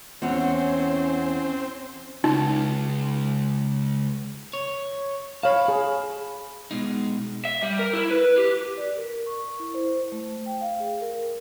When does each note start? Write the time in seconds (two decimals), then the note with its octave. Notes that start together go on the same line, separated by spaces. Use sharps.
0.22 E2 C4 C#4 C#5 F#5
2.24 C#2 D#4
4.53 C#5
5.43 C#5 F5 A5 B5
5.68 G#4
6.71 B2 G#3 D#4
7.45 E5
7.63 G3
7.79 A#4
7.93 E4
8.11 B4
8.38 G4
8.77 D5
8.97 A#4
9.27 C#6
9.60 E4
9.74 C5
10.12 A3
10.46 G5
10.61 F5
10.80 G#4
11.01 A#4